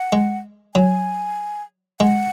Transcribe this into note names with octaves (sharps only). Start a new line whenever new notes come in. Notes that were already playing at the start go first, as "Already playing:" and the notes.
Already playing: F#5
G#3
F#3 G#5
G#3 F#5